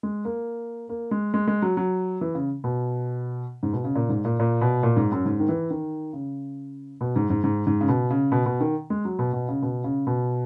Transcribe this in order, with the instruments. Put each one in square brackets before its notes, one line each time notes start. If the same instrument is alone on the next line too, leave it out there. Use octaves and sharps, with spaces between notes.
[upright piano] G#3
A#3
A#3
G#3
G#3
G#3
F#3
F#3
E3
C#3
B2
G#2
B2
C#3
A#2
G#2
A#2
A#2
B2
A#2
G#2
F#2
G#2
D#3
E3
D#3
C#3
B2
G#2
G#2
G#2
G#2
C#3
B2
C#3
B2
B2
D#3
G#3
F#3
B2
B2
C#3
B2
C#3
B2